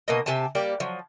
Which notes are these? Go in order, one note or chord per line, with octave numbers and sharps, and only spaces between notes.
B2 A#3 D#5
C3 G4 G#5 A5
G3 A#3 G4 D5
F3 F#3